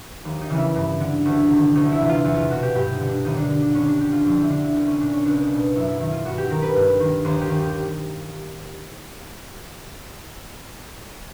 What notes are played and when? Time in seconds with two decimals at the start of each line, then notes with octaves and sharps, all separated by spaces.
0.25 D#2
0.41 D#4
0.50 C#3 E3
0.58 E4
0.75 G2
1.00 D3
1.26 D2
1.51 C3 D#3
1.75 D2 D#4
1.92 E4
2.01 C3 E3
2.09 F4
2.24 E2 E4
2.37 F4
2.50 B2 F#4
2.63 G4
2.75 G2 G4
2.92 D#4
3.00 D3
3.09 D4
3.25 D#2 D#4
3.37 D4
3.50 D3
3.62 D4
3.75 D#2 C#4
3.88 D4
4.00 D3 G4
4.13 F4
4.25 F2 F4
4.38 E4
4.50 D3 D4
4.63 E4
4.75 C2 D#4
4.87 C#4
5.00 A#2 D4
5.13 C#4
5.25 C#2 D4
5.42 D#4
5.50 B2
5.58 D#4
5.75 F#2 E4
5.88 E4
6.01 D#3 E4
6.12 F4
6.25 G2 F#4
6.38 G4
6.51 D#3 A#4
6.62 B4
6.76 G2
7.00 D#3
7.25 D#2 C5
7.41 G4
7.50 D#3
7.59 G4